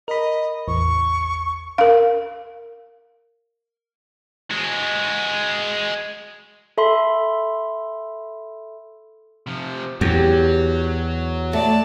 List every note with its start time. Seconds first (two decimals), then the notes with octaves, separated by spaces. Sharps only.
0.08 A#4 D#5 B5
0.68 A1 E2 C#6
1.78 A#4 F5
4.51 G#3 F#4
6.78 A4 E5 B5 C6
9.47 C3 F3
10.01 E2 F#3 G4
11.53 A3 D5 A5